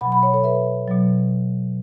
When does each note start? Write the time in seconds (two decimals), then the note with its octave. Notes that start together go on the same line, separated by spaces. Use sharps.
0.01 B2 F#3 F#5 B5
0.12 F#5 B5
0.23 C#5 F#5
0.34 A4 C#5
0.44 B4 E5
0.88 B2 F#3